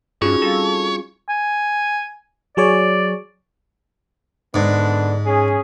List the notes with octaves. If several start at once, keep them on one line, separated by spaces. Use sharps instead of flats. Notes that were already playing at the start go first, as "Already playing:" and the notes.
G2 C#4 D#4 F4 F#4 G#4 C#5
G3 C4 A4 F5
G#5
F#3 G#4 C#5 D5
G#2 D3 B3 D4
C#4 G#4